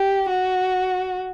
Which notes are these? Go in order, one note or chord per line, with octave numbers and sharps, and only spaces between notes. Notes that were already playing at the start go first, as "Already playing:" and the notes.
Already playing: G4
F#4